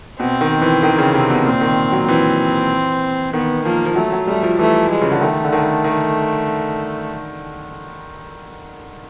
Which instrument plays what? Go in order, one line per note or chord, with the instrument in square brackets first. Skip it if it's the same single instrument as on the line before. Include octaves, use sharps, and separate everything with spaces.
[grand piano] B2 [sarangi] C4
[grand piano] D#3
E3
D#3
C#3
C3
B2
[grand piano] A#2 [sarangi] C4
[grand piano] D#3
F#3
[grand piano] E3 [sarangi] C4
[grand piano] D#3 [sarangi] B3
[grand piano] F3 [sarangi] A#3
[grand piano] F3
[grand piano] F#3 [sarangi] A3
[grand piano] F#3
[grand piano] G3 [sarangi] A3
[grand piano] F3
[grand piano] E3 [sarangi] A3
[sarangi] G#3
[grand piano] C#3
D3
[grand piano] D#3 [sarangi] A3
[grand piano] D3
D#3
D#3